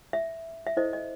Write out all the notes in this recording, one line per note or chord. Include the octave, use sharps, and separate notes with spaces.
E5
E5
E4 A4 C5 D#5
D#5